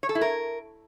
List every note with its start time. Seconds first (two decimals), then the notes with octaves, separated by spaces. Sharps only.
0.03 C#5
0.09 A4
0.15 E4
0.21 A#4